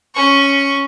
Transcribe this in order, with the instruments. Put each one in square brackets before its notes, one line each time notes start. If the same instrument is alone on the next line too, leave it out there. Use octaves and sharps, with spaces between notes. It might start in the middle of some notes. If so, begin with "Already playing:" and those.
[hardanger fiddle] C#4 C#6